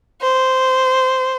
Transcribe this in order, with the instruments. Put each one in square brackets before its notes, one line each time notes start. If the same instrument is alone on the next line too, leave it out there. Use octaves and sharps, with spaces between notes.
[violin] C5